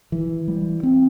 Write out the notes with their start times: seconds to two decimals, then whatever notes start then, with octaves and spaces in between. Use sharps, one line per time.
0.12 E3
0.48 G3
0.83 C4